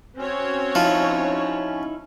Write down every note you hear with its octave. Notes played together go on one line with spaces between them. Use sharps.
C4 C#4 F#4 C#5
F3 D#4 E4